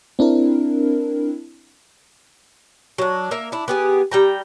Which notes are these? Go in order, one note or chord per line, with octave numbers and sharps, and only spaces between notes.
C4 D4 E4 A#4
F#3 D4
A#3 A#4 E5
D4 E4
B3 G4 G#4
G3 G5 A#5